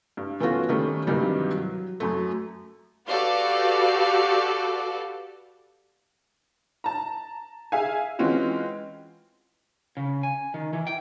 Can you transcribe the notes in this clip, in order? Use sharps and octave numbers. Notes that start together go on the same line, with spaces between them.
G2
E3 A3 B3 C#4 F4 F#4
D#3 G3 A3 C#4 D#4
G2 C3 D#3 E3 F#3 G3
F#3
F#2 F#3 A3
F#4 G4 A4 B4 D5 F5
A5 A#5
G#4 E5 F5 G#5
E3 G#3 C4 C#4 F4 F#4
C#3
G#5
D#3
E3
G5